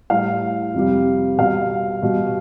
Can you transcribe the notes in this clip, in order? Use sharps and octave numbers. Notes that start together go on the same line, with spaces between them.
A2 G3 F5
F2 C3 G3
B2 G3 F5
B2 G3